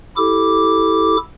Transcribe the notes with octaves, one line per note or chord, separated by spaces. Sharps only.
E4 G4 A4 D6